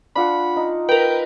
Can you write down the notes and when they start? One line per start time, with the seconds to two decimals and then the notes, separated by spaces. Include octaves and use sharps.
0.16 D4 F4 F#5 B5
0.56 D#4
0.89 A#4 B4 G5